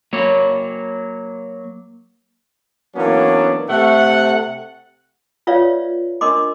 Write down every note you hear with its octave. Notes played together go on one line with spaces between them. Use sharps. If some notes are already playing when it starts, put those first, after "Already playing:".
F#3 A#3 C#5
E3 F#3 A#3 B3 C#4 D4
C3 A3 F#5
F4 B4 C#5 D5 E5 F5
D4 A#4 D#5 C6 D6